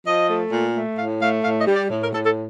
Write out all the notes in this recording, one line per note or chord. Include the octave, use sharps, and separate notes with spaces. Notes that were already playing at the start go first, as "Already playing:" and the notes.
F3 D#5
A3
A#2
A3
A2 F5
A3 F5
A2 F5
D#5
G3
D5
A2
A#4
A2 A4
A4